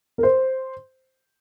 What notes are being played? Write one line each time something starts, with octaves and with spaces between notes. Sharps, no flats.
A#4
C5